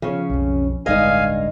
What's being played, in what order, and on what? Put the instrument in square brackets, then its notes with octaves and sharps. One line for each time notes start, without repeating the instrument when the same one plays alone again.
[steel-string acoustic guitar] C#3 C#4 [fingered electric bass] F3
[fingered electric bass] B1 F2
[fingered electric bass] D1 G1 G#3 [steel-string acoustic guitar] G2 D#4 D#5 [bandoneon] F5 G#5